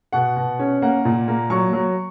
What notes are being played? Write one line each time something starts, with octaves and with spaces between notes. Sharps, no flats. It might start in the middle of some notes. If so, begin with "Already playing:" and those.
B2 F#5
B2
C#4
A#3 F#5
A#2
A#3
F#3 C#6
F#3